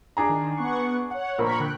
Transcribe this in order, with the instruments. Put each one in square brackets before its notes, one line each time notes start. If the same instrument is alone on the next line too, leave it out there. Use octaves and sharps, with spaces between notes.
[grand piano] D4 G#4 A#5
[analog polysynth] D#3
B3 F#5 C#6
C#5 F#5
[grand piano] A#1 A#3 C5 [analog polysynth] A#4 B5 C#6
[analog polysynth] D3 G5 F#6